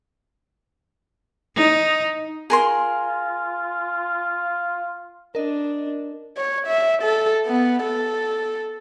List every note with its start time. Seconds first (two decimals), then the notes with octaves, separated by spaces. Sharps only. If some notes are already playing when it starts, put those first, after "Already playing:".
1.56 D#4
2.50 F4 G#4 A#4 C6
5.35 D4 A#4 D#5
6.37 C#5
6.67 E5
7.02 A4
7.46 B3
7.83 A4